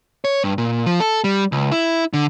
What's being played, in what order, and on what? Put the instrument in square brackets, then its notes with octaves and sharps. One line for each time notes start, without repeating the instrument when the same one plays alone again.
[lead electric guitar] C#5
G2
A#2
F3
A4
G3
C#2
E4
D3